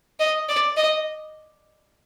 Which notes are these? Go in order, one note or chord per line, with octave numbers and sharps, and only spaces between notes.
D#5
D5
D#5